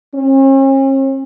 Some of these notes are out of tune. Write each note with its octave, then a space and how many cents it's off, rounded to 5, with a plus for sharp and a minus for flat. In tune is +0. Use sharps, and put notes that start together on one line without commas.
C#4 -45